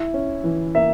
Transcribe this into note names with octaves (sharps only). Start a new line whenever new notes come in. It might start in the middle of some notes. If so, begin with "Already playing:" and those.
Already playing: E4 E5
C#4
E3
A#3 E5